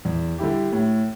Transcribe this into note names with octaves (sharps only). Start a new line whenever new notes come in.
E2
D3 G3 E4 G4
A2